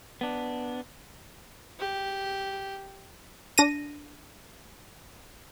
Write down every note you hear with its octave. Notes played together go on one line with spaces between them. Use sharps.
B3 D4
G4
D4 A#6 D#7